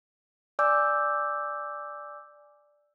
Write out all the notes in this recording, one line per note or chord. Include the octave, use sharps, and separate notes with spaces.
D5 G#5 D6 E6 G6